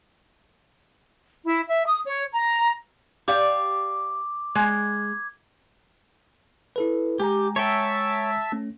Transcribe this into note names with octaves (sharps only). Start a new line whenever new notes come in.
E4
E5
D#6
C#5
A#5
G4 D5 F5 D6
G#3 G#6
E4 A4 B4
G#3 G4 G#5 A#5
C#5 E5 G5 A5
A3 C#4